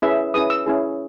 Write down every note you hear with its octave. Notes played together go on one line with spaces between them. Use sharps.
C#4 E4 G#4 B4 E5
C#4 E4 G#4 B4 D#6
E6
C#4 E4 G#4